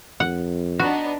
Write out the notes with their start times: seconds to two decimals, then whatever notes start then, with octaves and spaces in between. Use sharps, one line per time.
0.20 F2 F#5
0.79 B3 D4 D#4 F#4